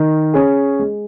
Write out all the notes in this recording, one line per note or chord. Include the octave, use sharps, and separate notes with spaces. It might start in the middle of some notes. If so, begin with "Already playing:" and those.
Already playing: D#3
C#4 G#4
G#3